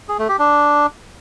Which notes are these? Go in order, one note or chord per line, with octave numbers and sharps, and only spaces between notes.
G#4
A3
G4
D4